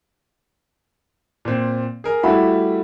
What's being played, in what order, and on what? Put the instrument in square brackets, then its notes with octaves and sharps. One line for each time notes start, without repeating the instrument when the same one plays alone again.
[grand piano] A#2 C4
G#4 A#4
[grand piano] G3 A3 [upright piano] E4 F#4 B5